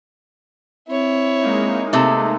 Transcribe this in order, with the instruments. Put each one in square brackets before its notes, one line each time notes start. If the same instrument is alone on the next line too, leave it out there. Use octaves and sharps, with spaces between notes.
[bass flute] C4 [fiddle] E4 C#5
[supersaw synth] G#3 A#3 D#4
[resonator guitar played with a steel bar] C3 A3